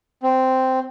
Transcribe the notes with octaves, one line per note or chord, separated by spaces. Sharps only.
C4